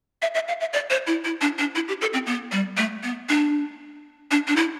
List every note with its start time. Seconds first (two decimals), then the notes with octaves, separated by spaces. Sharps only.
0.22 E5
0.34 E5
0.48 F5
0.60 E5
0.73 D5
0.90 C5
1.07 E4
1.24 E4
1.41 D4
1.58 D4
1.75 E4
1.88 G4
2.01 A4
2.13 C4
2.26 B3
2.52 G3
2.77 A3
3.03 B3
3.29 D4
4.31 D4
4.47 D4
4.56 E4